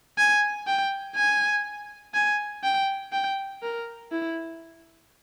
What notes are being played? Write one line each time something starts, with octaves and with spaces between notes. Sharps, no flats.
G#5
G5
G#5
G#5
G5
G5
A#4
E4